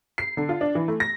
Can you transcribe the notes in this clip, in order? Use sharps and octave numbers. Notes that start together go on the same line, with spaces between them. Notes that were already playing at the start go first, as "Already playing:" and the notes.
C7
D3
F4
D4
E3
A3
A#6